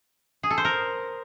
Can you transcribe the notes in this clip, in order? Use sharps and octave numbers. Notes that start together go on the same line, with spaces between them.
G#4
A4
C5
A#4